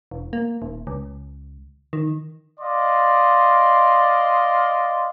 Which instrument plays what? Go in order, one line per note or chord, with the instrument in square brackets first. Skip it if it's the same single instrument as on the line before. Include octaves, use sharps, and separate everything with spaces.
[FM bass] E1
A#3
D#1
C#2
D#3
[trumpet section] D5 D#5 F5 C6